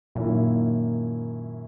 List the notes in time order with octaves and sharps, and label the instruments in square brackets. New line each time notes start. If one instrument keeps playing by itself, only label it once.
[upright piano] F#2 D#3 A#3 E4 [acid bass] A#2